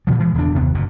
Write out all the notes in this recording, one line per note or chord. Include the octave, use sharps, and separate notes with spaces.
G2 A#2 C#3 F3
E3 F3 G#3
D#1 E2 C#3 D4
F#1 D#2 C3 B3
F#1 D2 A#2